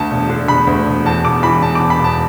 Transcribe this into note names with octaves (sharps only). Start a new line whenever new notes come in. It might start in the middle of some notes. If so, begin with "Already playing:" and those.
Already playing: D2 A5
E1
D3
E1 B5
D2
E1
E2 A5
E1 D6
E3 B5
E1 A5
E2 D6
B5
E1 A5